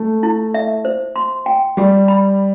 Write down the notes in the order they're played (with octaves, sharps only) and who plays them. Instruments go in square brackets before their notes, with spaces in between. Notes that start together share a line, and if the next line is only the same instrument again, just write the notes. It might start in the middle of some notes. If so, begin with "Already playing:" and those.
Already playing: [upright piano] A3
[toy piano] E4
E5
C5
C6
G5
[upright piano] G3 [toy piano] G4
[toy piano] B5